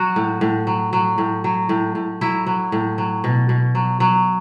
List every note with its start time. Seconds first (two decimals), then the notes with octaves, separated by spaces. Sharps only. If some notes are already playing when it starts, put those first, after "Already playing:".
Already playing: F#3 F#4
0.16 A2
0.41 A2
0.67 F#3
0.93 F#3
1.18 A2
1.44 F#3
1.69 A2
1.95 A2
2.21 F#3 E4
2.47 F#3
2.72 A2
2.98 F#3
3.24 B2
3.49 B2
3.75 F#3
4.00 F#3